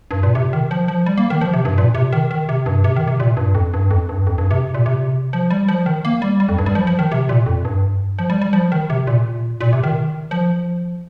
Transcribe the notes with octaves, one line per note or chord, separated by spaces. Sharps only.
G2
A#2
C3
D#3
F3
F3
G3
A#3
D#3
F3
C3
G2
A#2
C3
D#3
D#3
C3
G2
C3
D#3
C3
A#2
G2
F2
G2
F2
G2
F2
G2
C3
A#2
C3
F3
G3
F3
D#3
A#3
G3
G3
F2
G2
G3
F3
F3
D#3
C3
A#2
F2
G2
F3
G3
G3
F3
D#3
C3
A#2
A#2
C3
D#3
F3